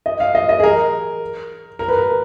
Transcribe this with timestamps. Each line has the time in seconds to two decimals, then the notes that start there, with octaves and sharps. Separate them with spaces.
0.06 D#5
0.20 F5
0.35 D#5
0.49 D#5
0.60 G#4
0.64 A#4
1.79 A#4
1.88 B4
1.98 A#4